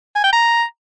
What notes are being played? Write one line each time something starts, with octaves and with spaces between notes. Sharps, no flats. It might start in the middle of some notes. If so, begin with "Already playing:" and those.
G#5
G5
A#5